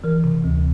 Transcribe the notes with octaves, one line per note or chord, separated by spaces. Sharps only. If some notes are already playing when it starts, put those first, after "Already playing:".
E3 A#4
C3
D2